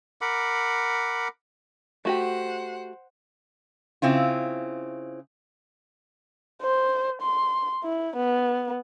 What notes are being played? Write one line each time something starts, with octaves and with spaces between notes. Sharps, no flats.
A#4 F#5 B5 D6
A3 F#4 G4 C5 F#5
C#3 C4 E4 F4
C5
C6
E4
B3